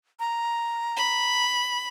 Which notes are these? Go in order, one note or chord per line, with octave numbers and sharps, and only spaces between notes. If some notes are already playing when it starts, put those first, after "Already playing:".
A#5
B5